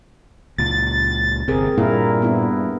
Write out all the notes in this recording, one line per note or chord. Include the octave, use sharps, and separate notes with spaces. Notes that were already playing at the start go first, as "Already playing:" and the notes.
C#2 A#2 A6
G1 C3 C4 G#4 A#4
G2 A#2 A#3 E4 A#4
B3 E4